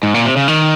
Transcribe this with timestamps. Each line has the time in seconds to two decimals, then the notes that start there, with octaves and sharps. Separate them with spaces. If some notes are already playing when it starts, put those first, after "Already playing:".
0.03 G#2
0.14 A#2
0.25 C3
0.36 C#3
0.48 D#3